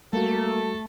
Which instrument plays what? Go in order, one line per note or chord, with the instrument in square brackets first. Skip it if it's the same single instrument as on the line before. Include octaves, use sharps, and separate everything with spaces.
[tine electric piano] G3 F#4 [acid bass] A3 [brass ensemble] A#3 [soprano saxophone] A4